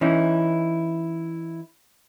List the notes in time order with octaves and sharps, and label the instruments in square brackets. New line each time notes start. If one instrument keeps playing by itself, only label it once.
[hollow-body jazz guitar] E3 C#4 D#4 E4